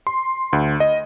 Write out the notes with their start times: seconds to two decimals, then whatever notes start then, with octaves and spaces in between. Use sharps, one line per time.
0.07 C6
0.53 D2
0.80 D#5